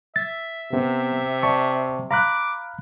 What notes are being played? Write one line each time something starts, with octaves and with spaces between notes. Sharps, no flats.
E5 A6
C3 B3
D5 A5 C#6
F5 A#5 B5 D6 F#6